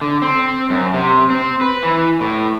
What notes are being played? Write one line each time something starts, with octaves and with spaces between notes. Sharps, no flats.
D3
C4
F#2
C3
C4
B4
E3
A2